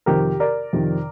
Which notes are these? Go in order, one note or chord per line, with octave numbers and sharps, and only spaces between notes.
F2 C3 D#3 G4 A#4
A#4 D5
F2 C3 D#3